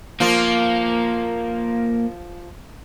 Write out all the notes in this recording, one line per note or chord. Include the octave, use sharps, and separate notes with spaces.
F3 A#3 F4